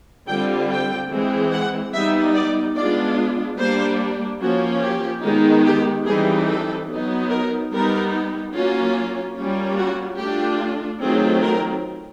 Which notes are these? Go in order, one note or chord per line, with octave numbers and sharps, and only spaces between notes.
D3 G3 C4 F4 G5
G5
E3 G#3 C4
F#5
G3 B3 D#4 E5
D5
G#3 B3 D4 F4 D5
G3 A#3 D4 C5
F3 A#3 C#4 F4 F#4
G4
D#3 G#3 B3 D#4
G4
E3 G3 C4 D#4 G#4
A4
F#3 B3 D#4
A#4
G3 B3 D#4 A#4
F#3 A#3 C#4 F4 F#4
G3 A#3 C#4 F4
F#4
A3 D4 F4 G4
D#3 F#3 A3 C4 F4 G#4
A#4